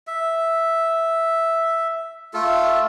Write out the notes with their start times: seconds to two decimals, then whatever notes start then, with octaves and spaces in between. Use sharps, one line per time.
0.07 E5
2.34 A3 F4 A4